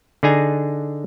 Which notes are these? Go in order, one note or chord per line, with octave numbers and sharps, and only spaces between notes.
D3 D4 D#4 G#4 G#5 A#5